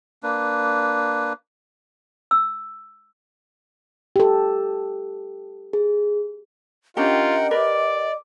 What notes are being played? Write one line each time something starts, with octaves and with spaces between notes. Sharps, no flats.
A#3 D4 B4
E6
G4 A4
G#4
C#4 D4 F4 G4 A#4 D#5 F#5 G5
G4 A#4 B4 D5 D6